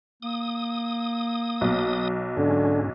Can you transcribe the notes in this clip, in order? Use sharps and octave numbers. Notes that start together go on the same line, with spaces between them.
A#3 D#6
B1
G#2 D3 C#4